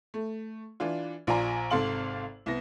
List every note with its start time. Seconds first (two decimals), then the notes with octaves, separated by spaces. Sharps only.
0.14 A3
0.80 E3 D4 F4
1.27 A#1 F4 D5 G#5 A#5
1.70 G#1 C3 A4 F5 C6 F#7
2.46 C2 B3 A#6